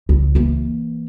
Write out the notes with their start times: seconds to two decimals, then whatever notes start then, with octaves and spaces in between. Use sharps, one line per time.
0.09 C#2
0.35 E3 A#3